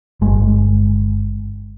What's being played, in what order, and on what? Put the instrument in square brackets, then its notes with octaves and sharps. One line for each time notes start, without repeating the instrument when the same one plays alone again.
[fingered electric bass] G1 G#3